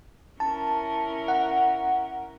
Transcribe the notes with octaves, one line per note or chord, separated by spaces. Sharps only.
C#4 E4 A#4 A5
F#5